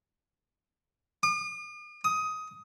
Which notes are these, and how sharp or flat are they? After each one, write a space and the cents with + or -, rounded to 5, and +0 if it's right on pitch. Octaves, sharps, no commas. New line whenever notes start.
D#6 -45
D#6 +15